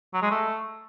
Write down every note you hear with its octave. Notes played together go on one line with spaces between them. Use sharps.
F#3
G#3
A3